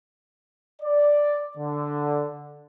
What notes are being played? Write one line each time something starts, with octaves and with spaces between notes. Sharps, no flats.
D5
D3